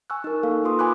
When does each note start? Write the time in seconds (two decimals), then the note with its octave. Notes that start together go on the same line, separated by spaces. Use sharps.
0.10 G#5 C#6 E6 F#6
0.24 D#4 A#4
0.43 A#3 A4 F5
0.64 A#3 F4 B4 C6 D#6
0.79 G#5 B5 D6 D#6 F#6